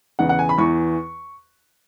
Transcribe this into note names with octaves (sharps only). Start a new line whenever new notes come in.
E2 C#3 E3 F#5
F#5
G#5
B5
E2 E3 C#6